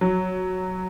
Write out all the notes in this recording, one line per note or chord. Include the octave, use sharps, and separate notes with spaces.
F#3